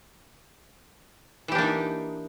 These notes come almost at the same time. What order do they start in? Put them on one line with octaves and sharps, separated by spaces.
E3 G4 D4 A#3 D#4